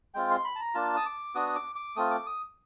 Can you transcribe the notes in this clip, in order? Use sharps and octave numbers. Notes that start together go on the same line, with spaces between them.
G#3 C4 F4 G5
C6
B5
A5
A#5
A#3 D4 F4 A5
D#6
D6
B3 D4 F#4 D#6
D6
D6
A3 C4 F4 D#6
D6
D#6